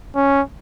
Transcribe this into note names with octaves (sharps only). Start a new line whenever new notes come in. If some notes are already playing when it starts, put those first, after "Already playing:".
C#4